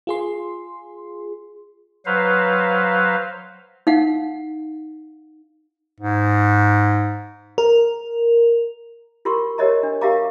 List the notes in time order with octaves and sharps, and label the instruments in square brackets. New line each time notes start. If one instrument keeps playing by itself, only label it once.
[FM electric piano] F4 G#4 C6
[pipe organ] F#3 B4 C5 F5
[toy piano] D#4 F5 F#5
[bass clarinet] G#2
[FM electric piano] A#4
[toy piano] F4 G4 A#4 C6 C#6
G4 A#4 C#5 D#5 E5 A#5
D4
G4 A#4 E5 F5 A#5 D6